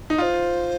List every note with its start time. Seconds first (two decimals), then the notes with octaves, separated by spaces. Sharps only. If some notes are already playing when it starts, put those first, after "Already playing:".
0.10 D#4
0.18 F4 D#5
0.22 C5